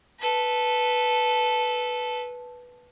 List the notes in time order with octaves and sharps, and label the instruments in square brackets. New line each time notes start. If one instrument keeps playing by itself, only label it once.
[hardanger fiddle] A4 B4